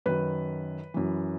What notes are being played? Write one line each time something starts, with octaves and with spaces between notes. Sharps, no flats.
F#2 D#3 B4
F#2 E3